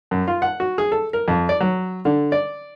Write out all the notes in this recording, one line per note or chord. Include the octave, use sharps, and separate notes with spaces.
F#2
F4
F#5
F#4
G#4
A4
A#4
F2
D5
F#3
D3
D5